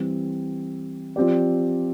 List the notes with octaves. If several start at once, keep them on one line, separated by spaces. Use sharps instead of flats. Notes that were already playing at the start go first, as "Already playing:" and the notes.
Already playing: E3 G3 C4
F3 C4 G4 D5